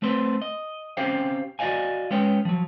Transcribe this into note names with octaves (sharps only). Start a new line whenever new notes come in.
A3 C4 B4 C5
D#5
C4 C#4 G4 C5 F5 G5
F#4 D5 D#5 F5 G#5
G#3 C#4 B4 C#5 G5
F3 F#3